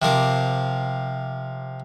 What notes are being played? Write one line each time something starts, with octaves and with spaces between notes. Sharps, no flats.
C3 F3 A#4 D6